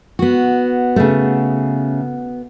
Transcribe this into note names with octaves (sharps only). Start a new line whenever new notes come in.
B3 F#4
C#3 A3